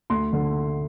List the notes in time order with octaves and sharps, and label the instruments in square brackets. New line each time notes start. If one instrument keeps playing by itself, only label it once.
[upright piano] D2 C6
D3